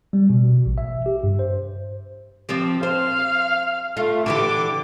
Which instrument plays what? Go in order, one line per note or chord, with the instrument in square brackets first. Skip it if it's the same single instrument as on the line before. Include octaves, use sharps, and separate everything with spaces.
[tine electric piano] G3
B2
A1
E5
G4
G2
C5
[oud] F3 C4 G4
[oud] C5 [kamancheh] F5
[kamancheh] A3 [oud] F4
[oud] D3 E3 G4 [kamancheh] D6